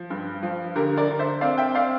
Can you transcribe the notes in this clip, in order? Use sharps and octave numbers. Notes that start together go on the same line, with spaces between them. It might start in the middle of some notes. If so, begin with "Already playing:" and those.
Already playing: F3
G2
F3
D3 G4 A#4
A#4 D5
D3
C5 E5
C4 D5 F5
E5 G5
C4 D5 F5